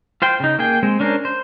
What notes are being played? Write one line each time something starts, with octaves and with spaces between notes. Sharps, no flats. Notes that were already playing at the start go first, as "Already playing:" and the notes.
F4 C5 G5
C#3 D#4
A#3 G#4 G5
G#3 C4
C#4 D4 A#4 C5
C5